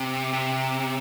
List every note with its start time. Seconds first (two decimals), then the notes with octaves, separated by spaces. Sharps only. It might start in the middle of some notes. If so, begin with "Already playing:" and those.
Already playing: C3
0.33 C3